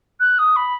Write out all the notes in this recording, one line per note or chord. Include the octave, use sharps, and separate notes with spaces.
F#6
D#6
B5